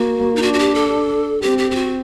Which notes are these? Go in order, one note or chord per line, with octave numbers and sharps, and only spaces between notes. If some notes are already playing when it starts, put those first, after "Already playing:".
Already playing: A#3 F#4
D#4
D4 F#4
F#4
G4
A4
C4 G4
G4
G4
F#4